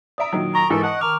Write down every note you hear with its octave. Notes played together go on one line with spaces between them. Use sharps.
D5 E5 A#5 D#6 D7
A#2 D#3 F#3
A#5 C#6
G#2 E3 A4 A#4
D#5 F#5 A5
D#3 A#5 D6 F6